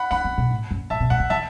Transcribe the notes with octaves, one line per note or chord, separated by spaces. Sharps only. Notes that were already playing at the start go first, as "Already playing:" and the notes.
Already playing: F#5 B5
D4 F#5 B5
B3
B2
A2
F#2
A2 E5 A5
B2
A2 F#5
D3
E3 E5 A5